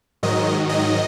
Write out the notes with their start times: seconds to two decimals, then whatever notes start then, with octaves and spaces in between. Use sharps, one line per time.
0.23 G#2 D#3 F#3 D#5
0.69 D#5